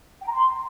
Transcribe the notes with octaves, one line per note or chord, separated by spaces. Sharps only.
G5
A#5
C6